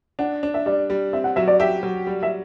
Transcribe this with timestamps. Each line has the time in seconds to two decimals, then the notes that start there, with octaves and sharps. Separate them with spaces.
0.19 D4 F#5
0.43 D4
0.54 E5
0.66 G3 D5
0.90 G3
1.13 C4 E5
1.24 F#5
1.36 F#3 E5
1.48 D5
1.60 G4 E5
1.83 F#3
2.07 G3
2.23 E5